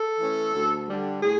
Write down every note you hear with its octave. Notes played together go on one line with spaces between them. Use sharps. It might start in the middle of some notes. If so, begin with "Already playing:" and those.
Already playing: A4
E3 A3 C#4
D2
D3 G3
A2 G#4